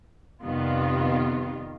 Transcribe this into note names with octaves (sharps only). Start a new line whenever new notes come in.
F2 C3 D#3 G3 B3 F4